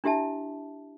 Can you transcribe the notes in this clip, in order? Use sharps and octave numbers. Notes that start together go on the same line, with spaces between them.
D4 E4 G4 E5 A5